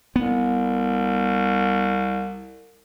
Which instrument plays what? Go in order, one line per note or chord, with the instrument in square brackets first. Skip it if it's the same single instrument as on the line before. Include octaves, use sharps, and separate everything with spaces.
[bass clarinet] C2 [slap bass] B3